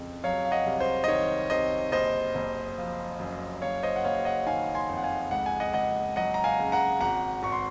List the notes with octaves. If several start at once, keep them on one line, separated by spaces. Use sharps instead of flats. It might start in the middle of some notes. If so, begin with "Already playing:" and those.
Already playing: F2 C#3
F#3 C#5 F5
F5
D#5 F#5
C2
C5
D#5
D#3 C#5
C3 C5 D#5
F#1 C5 D#5
F#1
F3
F#2
F#1 C#5 F5
C5 D#5
F#5
F#1 C#5 F5
D#5 F#5
D#3 F5 G#5
G#5 C6
F2
F#5
F5 G#5
C#2 F#5
G#5
D#5 F#5
C#2 D#5 F#5
F#3 D#5 F#5
A#5
F5 G#5
C#3
F#5 A#5
G#1 F#5 A#5
G#1 C#6
C6